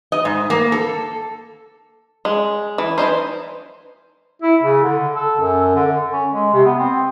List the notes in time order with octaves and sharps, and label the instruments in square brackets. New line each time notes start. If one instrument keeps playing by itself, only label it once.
[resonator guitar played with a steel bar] D#5
G#2
A#3
A4
[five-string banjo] G#3
E3
E3 A3 D#4 C5
[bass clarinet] E4
C#3
D3
A4
F#2
D3
C#4
G#3
C3
B3
C4